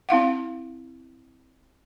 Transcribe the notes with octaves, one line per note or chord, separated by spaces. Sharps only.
C4 E4 F5 F#5